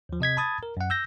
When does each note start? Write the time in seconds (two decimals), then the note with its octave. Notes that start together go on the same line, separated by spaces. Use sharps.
0.09 D#2 F3
0.20 C3 D#5 G#6 B6
0.37 A5 B5 D#6 G#6 A6
0.63 A#4
0.77 F#2 F#5
0.90 E6 G6 A#6